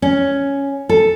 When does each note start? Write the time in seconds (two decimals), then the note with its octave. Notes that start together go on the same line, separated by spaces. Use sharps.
0.02 C#4
0.89 A4